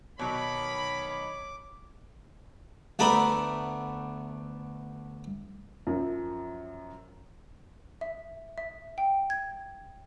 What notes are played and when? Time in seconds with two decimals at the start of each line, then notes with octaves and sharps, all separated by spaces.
0.19 B2 D#3 F#3 C#5 B5 D6
2.99 D2 A3 B3 D4 A#5 B5
5.87 F#2 F3
8.01 E5
8.58 E5
8.98 G5
9.30 G#6